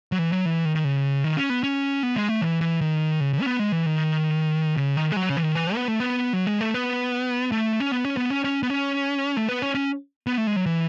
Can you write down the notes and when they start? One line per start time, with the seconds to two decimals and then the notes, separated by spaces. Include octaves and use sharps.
0.12 F#3
0.19 E3
0.32 F#3
0.45 E3
0.65 D#3
0.75 D#3
0.84 C#3
1.24 D#3
1.37 C#4
1.50 B3
1.63 C#4
2.03 B3
2.16 G#3
2.29 A3
2.41 E3
2.61 E3
2.81 D#3
3.20 C#3
3.33 C#3
3.41 C#4
3.46 B3
3.59 G#3
3.72 E3
3.86 D#3
4.77 C#3
4.96 D#3
5.12 G#3
5.17 F#3
5.29 C#3
5.37 E3
5.43 D#3
5.55 E3
5.75 B3
5.88 A3
6.00 B3
6.33 F#3
6.47 G#3
6.61 A3
6.74 B3
7.52 A3
7.80 C#4
7.92 B3
8.05 C#4
8.17 B3
8.30 C#4
8.45 C#4
8.63 B3
8.70 C#4
9.37 A3
9.49 B3
9.62 C#4
9.75 C#4
10.27 B3
10.38 A3
10.47 G#3
10.56 F#3
10.66 E3